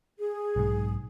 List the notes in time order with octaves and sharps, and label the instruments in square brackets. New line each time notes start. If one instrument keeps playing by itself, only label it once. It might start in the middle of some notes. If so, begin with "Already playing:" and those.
[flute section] G#4
[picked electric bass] B1 G#2